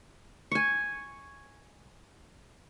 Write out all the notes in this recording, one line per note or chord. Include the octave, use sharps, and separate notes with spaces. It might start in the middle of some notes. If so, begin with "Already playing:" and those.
G#5 C#6